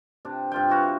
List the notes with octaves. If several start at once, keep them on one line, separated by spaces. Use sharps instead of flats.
C3 D4
G2 F4 G5
E4 F#4 F5